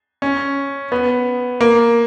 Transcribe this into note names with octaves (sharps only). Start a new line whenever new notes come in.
C#4
B3
A#3